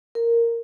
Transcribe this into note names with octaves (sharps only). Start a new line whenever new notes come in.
A#4